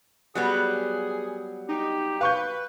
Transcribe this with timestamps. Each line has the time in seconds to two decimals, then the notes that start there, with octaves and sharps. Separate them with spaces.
0.35 F#3 G3 B3 G#4
1.69 D#4 G4
2.21 B4 F5 C#6 G6